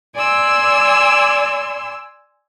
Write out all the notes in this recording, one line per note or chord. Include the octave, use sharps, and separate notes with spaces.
D5 G#5 C6 E6